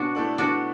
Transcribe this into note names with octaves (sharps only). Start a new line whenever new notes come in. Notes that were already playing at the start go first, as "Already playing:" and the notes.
Already playing: B2 D4 F#4
A3 E4 A4 D5
B2 D4 F#4